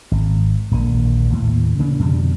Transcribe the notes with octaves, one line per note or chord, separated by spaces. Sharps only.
G#1
D#1 A#1 D3 A#3
D#2 A2
C#3 E3 A#3 D4
F2 B2 D3 G3